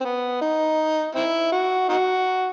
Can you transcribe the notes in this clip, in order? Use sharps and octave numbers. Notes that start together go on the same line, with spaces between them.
C4
B3
D#4
C4 E4
F#4
D#4 F#4